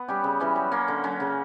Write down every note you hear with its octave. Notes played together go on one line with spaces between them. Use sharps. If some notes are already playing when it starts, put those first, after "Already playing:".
Already playing: B3
G3 C#4 G4
C#3
E3 G3 C#4
F#3
A#3 C#4
D3
F#3 C#4
C#3